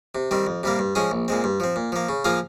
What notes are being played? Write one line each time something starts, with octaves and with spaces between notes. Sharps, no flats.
C3
D#3 G3 C4
F2
C3 G3 A#3
G2
F3 G#3 C#4 G#4
A#1
A#2 G#3 C4
G2
F3 C4
A#2
F3 A#3
C#3
F3 A#3 F4 G#4